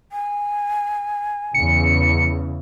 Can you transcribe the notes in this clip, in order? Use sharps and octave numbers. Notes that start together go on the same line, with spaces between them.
G#5
E2 C#3 C#7